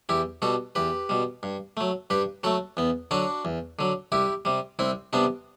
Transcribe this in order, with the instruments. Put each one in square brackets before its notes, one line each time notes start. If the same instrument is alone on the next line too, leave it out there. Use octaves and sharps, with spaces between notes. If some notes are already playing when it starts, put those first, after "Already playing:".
[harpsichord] E2 E4 G4
B2 G3 F#4 A4
E2 G4 B4
B2 G3
G2
F#3 A3
G2 G4 B4
F#3 A3 F#4 A4
E2 B3
D3 F#3 D4 F#4
E2
D3 F#3
C2 E4 G4
C3 G3
C2 C4 E4
C3 G3 B3 D4